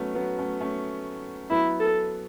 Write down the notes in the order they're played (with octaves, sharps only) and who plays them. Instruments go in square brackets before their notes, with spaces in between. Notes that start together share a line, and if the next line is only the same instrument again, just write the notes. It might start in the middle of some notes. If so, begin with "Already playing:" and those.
Already playing: [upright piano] F#3 A3 B3 C#4
F#3 B3
A3 C#4
A3 C#4
[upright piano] F#3 B3 [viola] E4
[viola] A4